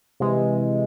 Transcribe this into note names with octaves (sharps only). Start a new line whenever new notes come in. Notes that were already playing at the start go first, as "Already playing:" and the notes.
C3 E3 G#3